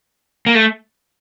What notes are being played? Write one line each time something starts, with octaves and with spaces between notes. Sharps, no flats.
A#3
A3